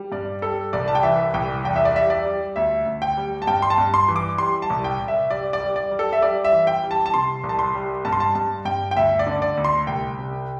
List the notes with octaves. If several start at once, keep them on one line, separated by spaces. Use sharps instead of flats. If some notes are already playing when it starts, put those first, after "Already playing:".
Already playing: G3
G2 D5
G3 A4
C2 D5
A5
G5
E3 E5
C2 G5
E2 G5
E5
D5
G3 E5
D5
G3
D2 E5
D2
G5
G3
A5
G2 G5
C6
A5
G2
C6
E3
D6
G3 C6
A5
C2
G5
C2
E5
G3 D5
D5
G3
D5
G3
A4
E5
G3 D5
E5
E3
G5
G3
A5
A5
C3 C6
C2
A5
C6
G3
G2 A5
C6
A5
G2 A5
G2 G5
G5
D2 E5
D5
D3
D5
D2
C6
C2 G5
C3